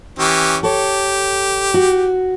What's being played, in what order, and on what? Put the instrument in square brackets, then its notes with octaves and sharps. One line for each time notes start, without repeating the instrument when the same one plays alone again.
[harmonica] E3 C#4 G4
[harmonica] G4 [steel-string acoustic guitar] A4 C#5
[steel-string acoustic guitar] F#4